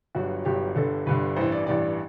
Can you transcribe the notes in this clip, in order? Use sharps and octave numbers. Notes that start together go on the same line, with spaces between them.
G1 G2 F#3 F#4
G1 G2 F#3 G4
G1 G2 D3 A4
G1 G2 D3 B4
A1 G2 E3 C5
D5
A1 G2 E3 D5